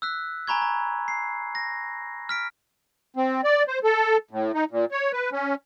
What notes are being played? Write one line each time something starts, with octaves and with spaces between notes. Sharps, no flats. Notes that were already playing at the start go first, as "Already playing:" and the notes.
E6 F#6 B6
G#5 A#5 B5 C#6 G#6
A#5
C7
A#6
F6 B6 D7
C4
D5
C5
A4
A2
D#4
A#2
C#5
B4
C#4